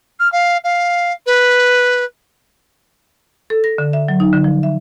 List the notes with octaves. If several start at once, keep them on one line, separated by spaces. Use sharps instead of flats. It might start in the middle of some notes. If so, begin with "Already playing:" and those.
F6
F5
F5
B4
A4
A#6
D3
E5
F#3
D#4
D3
F3
E5